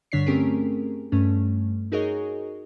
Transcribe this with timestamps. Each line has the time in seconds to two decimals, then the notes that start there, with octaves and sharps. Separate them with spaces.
0.12 G2 D3 D4 C#5 B6 C7
0.26 A3 C4 C#4 G4 G#4 A#4
1.12 G2 A3 C#4
1.92 D#4 F#4 G#4 A#4 C#5 D#5